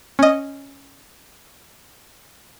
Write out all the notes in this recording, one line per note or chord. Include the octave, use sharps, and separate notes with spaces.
C#4 D#5